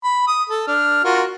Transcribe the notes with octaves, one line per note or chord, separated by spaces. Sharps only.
B5
D#6
A4
D4 F6
F4 F#4 A#4